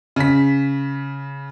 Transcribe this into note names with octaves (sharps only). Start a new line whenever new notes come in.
C#3 B6